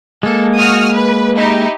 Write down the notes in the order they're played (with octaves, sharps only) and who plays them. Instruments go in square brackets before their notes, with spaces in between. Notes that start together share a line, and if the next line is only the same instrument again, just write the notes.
[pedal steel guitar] G#3 A#3 [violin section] A4
[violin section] F#4 D#6 F6
B4
D#4 E4 G4